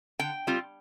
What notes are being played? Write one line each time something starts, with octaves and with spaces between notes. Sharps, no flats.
D3 G5
G3 C4 F4